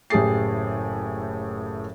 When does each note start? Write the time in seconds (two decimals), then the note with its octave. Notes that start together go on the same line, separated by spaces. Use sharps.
0.10 F#1 A2 G4 G#4 A6 C7